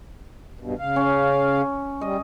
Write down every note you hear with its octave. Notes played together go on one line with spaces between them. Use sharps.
G2 B2
C#3 F5
C#4
G3 D#5